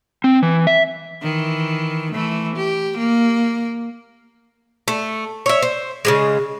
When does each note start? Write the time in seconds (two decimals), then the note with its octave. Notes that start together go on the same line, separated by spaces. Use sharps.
0.24 C4
0.43 E3
0.67 E5
1.22 D#3 E3
2.12 E3 A3
2.56 G4
2.98 A#3
4.88 A3
5.46 C#5 E5
5.62 C5
6.05 C#3 F3 G#3